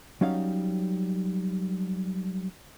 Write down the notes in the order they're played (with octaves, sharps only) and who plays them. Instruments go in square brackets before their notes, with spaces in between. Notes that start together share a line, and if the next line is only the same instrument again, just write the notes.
[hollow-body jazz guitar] F#3 G3 C#4 D#4 F5